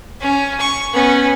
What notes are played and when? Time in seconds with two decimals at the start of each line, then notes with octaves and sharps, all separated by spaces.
0.20 C#4
0.60 C#6
0.93 B3 C#4